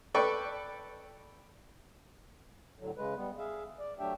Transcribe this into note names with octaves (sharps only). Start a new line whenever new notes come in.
A4 B4 D5 G5 C#6
A2 D3 F#3
C#3 G#3 B4
G3 B3
G#4 E5 F5
D5
F#3 A3 D4 G4 E5 G5